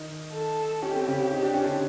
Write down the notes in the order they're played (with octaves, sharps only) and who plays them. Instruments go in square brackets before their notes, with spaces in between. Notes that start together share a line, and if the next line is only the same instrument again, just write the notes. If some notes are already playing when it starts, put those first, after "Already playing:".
Already playing: [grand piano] D#3 D#4
[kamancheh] A4
[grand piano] C#4 [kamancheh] G4
[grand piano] C4
C#3 C#4
D#4
D4
C#4
D3 D4